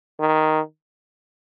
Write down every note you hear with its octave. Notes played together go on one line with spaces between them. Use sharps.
D#3